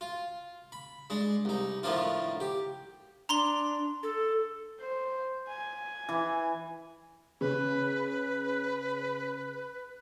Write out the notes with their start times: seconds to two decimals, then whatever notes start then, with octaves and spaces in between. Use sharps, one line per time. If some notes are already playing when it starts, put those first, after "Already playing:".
0.01 F4
0.72 B5
1.10 G#3 D4
1.45 C2 D#4
1.83 A2 D3 D#3 F3 D4 F4
2.40 G4
3.29 D4 A#5 C6 G7
4.03 A4
4.79 C5
5.48 G#5
6.09 E3
7.41 C#3 B4